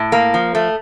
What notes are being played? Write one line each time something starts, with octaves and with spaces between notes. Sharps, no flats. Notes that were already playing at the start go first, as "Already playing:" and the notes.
Already playing: A2
A#3
F3
A3